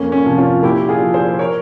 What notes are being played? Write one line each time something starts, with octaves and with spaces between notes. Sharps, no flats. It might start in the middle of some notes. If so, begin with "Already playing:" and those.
Already playing: F2 A#3 C#4
A#3 C#4
C3 F3
C#4 F4
A#2 E4 G4
F4 G#4
F3
G#4 C5
A#4 C#5